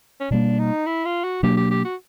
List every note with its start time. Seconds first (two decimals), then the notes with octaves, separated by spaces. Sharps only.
0.20 C#4
0.31 B2 G3 A#3 D4
0.59 D#4
0.86 E4
1.05 F4
1.24 F#4
1.43 B2 F#3 A#3 D4 G4
1.57 G4
1.71 G4
1.85 F#4